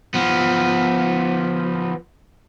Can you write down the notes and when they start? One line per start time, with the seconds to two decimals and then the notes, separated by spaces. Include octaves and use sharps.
0.14 F3 B3